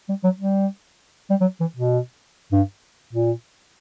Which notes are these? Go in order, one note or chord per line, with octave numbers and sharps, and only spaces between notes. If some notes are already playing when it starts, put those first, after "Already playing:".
G3
F#3
G3
G3
F#3
E3
B2
G2
A#2